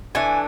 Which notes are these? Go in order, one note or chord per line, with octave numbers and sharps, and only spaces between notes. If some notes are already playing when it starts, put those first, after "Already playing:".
E3 A3 D4 G#5